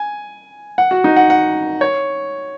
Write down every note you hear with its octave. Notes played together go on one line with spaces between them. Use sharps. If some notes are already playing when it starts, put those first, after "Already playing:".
Already playing: G#5
F#5
F#4
D#4
F#5
F#5
C#5